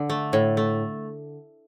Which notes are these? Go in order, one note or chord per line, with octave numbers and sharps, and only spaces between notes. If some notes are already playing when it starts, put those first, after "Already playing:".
Already playing: D3
A3
A2
A3